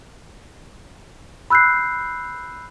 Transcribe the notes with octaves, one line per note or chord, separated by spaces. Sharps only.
B5 E6 F#6 G6 C7